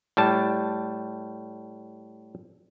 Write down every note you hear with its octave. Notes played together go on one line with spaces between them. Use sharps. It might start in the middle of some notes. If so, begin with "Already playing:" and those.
A2 G3 A5